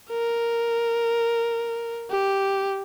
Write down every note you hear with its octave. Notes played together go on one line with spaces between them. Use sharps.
A#4
G4